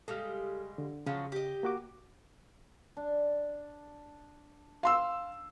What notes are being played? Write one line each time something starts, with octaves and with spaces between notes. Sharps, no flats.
C#3 G3 G#3 A4 F6
D3
C#3 F3 F#3 G#3
G4 D#5
A#3 F#4 D6
D4
F5 C6 E6